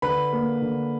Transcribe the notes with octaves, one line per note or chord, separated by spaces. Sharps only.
D3 B4 B5
A#3
D3